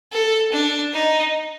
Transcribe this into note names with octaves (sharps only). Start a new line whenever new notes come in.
A4
D4
D#4